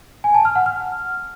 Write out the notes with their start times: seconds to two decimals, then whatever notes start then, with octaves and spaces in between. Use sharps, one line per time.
0.24 G#5
0.35 A5
0.45 F6
0.55 F#5
0.66 F6